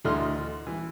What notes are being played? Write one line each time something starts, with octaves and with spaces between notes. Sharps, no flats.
D2 A3 E4 D#5 C6 F6
E3